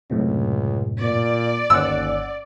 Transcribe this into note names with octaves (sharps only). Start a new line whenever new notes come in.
C#2 F#2 A2 C3
A#2 D5
G1 D#2 C#4 F#5 E6